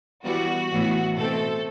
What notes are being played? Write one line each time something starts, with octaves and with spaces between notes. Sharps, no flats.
E3 G3 B3 F#4
A2 E3 B3
B2 A3 C4 A4